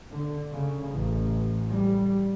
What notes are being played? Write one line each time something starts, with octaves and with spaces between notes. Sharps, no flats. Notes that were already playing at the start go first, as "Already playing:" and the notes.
D3
C#3
A1
G3